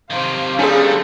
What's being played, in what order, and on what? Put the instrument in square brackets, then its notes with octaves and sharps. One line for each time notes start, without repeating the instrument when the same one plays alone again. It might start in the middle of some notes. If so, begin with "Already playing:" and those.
[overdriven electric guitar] C3 D#3 [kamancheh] C5 F5
[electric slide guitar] D3 G3 [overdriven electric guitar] A3 [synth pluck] C#4 G#4